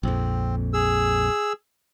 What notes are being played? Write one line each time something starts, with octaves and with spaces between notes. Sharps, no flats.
A#1 F2 C4
G#4 E6